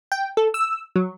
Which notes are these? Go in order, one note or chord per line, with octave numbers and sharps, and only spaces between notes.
G5
A4
E6
F#3